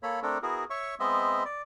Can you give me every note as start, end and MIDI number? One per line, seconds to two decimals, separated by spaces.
0.03 0.20 58
0.03 0.20 69
0.03 0.20 73
0.03 0.20 83
0.23 0.38 57
0.23 0.38 60
0.23 0.38 62
0.23 0.38 69
0.23 0.38 70
0.42 0.64 59
0.42 0.64 64
0.42 0.64 66
0.42 0.64 68
0.42 0.64 70
0.70 0.95 73
0.70 0.95 76
0.70 0.95 85
1.00 1.44 56
1.00 1.44 59
1.00 1.44 60
1.00 1.44 75
1.00 1.44 76
1.45 1.62 74